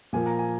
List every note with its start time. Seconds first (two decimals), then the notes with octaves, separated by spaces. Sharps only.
0.13 A#2 F3 A#3 G#5
0.26 A#5
0.39 G#5